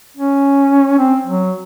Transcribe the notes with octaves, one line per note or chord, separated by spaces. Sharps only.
C#4
C4
F#3